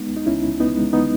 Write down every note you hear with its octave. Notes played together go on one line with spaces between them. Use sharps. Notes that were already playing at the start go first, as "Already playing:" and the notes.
Already playing: G#3 B3 D#4
C#2
D#4
C#2 C#4 E4
C#2
C#2 B3 D#4
G#3
B3 D#4